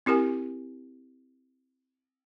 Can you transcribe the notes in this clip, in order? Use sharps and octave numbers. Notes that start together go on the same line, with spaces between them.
C4 E4 G4 A#4 G#5